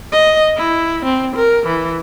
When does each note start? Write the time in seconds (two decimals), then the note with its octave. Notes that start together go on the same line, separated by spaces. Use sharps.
0.12 D#5
0.57 E4
1.05 C4
1.35 A#4
1.66 E3